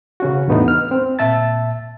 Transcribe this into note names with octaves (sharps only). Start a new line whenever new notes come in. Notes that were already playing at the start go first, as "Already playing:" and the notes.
C#3 C#4 F#4
E2 A2 A3 B3 D4 D#4
F6
C4
A#2 E5 A5 A6